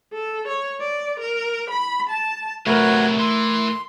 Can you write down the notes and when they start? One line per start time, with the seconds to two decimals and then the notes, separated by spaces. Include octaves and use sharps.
0.13 A4
0.48 C#5
0.80 D5
1.20 A#4
1.71 B5
2.10 A5
2.67 C3 F#3 A3 F#4 A#4 B4 C#5
3.19 E3 C6